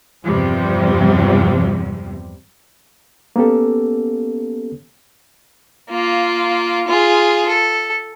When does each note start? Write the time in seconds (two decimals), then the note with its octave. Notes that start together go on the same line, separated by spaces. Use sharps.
0.23 E2 G2 C3 F3 G3
3.36 A#3 B3 C#4 G4 A4
5.90 A#3 F4
6.87 F4 G#4
7.48 A4